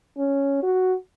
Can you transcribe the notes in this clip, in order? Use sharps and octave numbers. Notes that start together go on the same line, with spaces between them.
C#4
F#4